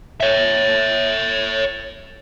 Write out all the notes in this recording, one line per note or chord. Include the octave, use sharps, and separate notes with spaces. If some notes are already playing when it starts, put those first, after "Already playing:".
C#5 E5